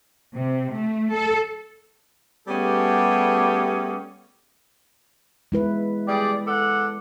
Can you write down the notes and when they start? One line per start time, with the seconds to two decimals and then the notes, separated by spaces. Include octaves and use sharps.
0.35 C3
0.73 A3
1.12 A4
2.48 G3 A3 B3 C#4 G4 G#4
5.52 G#3 E4 B4
6.07 G3 G#4 D5
6.47 A4 D5 F#5